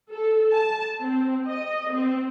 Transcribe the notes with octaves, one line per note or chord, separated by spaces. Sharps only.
A4
A5
C4
D#5
C4